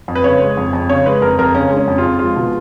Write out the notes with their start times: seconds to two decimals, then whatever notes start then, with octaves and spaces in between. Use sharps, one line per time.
0.08 F2
0.15 B4
0.24 C#3 C#5
0.41 G#3
0.57 F2
0.73 F2
0.89 C#3 C#5
1.06 G#3 B4
1.22 F2 A#4
1.39 F2 A#4
1.55 C#3 C#4
1.71 G#3
1.76 C#4
1.88 F2
1.98 F4
2.03 F2
2.19 G#3 F4
2.36 B2